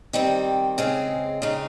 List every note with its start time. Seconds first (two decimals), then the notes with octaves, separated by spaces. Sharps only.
0.13 D#3 G3 C4
0.78 C#3 G#3 C4
1.42 C#3 G#3 D#4